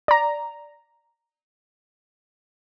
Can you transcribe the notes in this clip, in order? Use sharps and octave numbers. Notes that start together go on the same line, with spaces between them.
D5 A#5